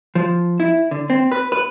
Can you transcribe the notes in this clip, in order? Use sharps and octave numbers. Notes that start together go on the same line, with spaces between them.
F3
E4
D3
C4
B4
B4